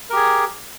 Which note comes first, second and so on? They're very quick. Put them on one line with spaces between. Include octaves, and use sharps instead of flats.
A#4 G4 G#4